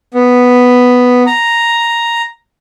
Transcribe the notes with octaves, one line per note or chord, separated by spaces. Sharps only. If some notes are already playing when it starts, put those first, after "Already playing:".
B3
A#5